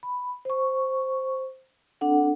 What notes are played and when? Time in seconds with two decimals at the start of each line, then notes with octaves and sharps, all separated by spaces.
0.03 B5
0.45 C5 C#6
2.01 C4 D4 A4 F#5